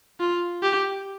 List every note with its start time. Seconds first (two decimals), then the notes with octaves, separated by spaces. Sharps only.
0.20 F4
0.63 G4